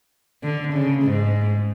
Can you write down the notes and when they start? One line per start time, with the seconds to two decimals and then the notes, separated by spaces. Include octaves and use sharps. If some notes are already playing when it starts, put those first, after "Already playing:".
0.43 D3
0.73 C#3
1.03 G#2